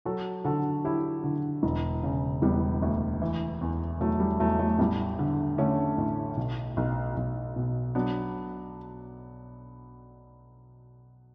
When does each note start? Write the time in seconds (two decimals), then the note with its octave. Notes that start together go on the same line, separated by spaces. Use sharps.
0.05 F#3 F#4 A4
0.44 D3 F#4 A4
0.85 F#3 E4 G4
1.24 D3
1.63 E1
2.03 C#3
2.42 E1 G3 B3
2.82 D2
3.22 E3
3.61 E2
4.00 E2 F#3 A3
4.20 G3
4.39 E2 F#3 A3
4.59 F#3 A3
4.79 A1 G3 B3
5.19 D3
5.58 D3 A3 C#4
5.98 A1
6.37 B1
6.77 B1
7.16 B1
7.56 B2
7.95 F#3 B3 D4